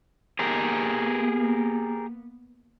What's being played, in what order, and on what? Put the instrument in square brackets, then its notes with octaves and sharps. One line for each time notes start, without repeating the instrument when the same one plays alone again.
[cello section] A#3 B3 [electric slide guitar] G4 G#4 A#4